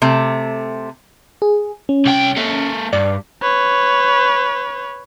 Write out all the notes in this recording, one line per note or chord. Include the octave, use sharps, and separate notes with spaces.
C3 A3
G#4
C#4
C2 G5
A#3 A4
G2 D5
B4 C#5